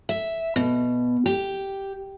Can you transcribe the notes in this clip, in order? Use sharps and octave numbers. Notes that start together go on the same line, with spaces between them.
E5
B2
G4